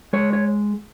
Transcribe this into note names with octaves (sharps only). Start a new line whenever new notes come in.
G#3 C#5
C#5